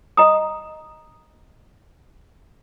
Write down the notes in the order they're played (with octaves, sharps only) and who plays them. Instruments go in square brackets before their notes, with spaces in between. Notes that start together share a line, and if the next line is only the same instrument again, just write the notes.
[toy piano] D#5 A#5 D#6